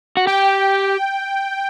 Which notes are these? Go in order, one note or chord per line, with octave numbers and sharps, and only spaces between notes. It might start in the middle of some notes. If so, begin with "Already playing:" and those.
F#4
G4 G5